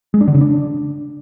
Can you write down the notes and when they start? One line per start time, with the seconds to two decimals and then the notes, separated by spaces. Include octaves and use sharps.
0.14 G#3
0.21 D4
0.28 D3
0.34 C#3
0.41 D4